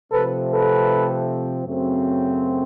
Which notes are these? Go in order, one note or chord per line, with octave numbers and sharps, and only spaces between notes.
C3 F3 A3 C4 A4 B4
A4 B4
F#2 C#3 F#3 A3 C4